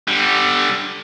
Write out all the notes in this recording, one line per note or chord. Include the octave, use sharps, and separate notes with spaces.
D3 G3